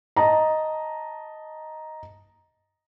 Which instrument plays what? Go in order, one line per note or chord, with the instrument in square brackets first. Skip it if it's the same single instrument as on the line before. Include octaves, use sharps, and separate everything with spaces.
[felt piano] D#5 A5 A#5